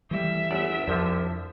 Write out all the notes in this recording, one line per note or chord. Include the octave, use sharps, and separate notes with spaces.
E3 G3 A3 E5
G1 E2 D5
C2 F2 D3 F3